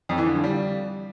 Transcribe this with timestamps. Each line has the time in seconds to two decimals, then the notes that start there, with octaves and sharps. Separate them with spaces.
0.09 F2
0.18 E3
0.26 D3
0.35 F3
0.43 G3